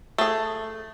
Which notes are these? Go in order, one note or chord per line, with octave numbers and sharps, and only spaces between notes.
A3 G#4